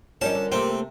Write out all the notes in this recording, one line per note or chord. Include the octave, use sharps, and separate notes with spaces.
F3 G3 C#4 D#4 A#4 A5
D3
C3 A3 A#3 C4 G4